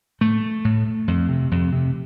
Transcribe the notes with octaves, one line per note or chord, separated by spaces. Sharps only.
A2 A3
A2
F2
C3
F2
C3